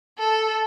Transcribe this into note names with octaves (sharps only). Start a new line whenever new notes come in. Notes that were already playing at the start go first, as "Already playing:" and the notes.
A4